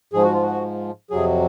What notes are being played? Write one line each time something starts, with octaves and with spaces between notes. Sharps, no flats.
G#2 F3 G#4
F#4
F4
F#4
F2 C3 F#3 G#4